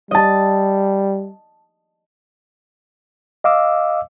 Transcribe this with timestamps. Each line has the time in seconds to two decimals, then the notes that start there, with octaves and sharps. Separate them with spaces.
0.11 G3 D#5 A5
3.44 D#5 F5 D6 E6